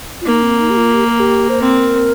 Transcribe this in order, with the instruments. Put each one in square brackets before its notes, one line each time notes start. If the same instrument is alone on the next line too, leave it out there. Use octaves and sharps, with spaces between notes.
[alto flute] F4
[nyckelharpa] A#3 [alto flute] D#4
[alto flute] C4
D#4
G4
F4
G4
A#4
G4
C5
[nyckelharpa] C4 [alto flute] A#4